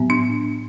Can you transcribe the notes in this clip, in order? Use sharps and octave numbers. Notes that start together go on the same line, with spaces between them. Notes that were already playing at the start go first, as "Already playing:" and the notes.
Already playing: A2 F#3 B3
D4